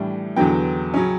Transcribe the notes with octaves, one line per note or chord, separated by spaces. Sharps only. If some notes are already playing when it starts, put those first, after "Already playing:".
Already playing: A2 E3 G3 D4
E2 D3 F#3 B3 G5
C#3 F#3 C#4